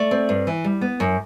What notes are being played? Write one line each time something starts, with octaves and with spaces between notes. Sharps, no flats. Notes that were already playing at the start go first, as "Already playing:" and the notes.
Already playing: A3 D5
C4
G2
E3
G3
B3
F#2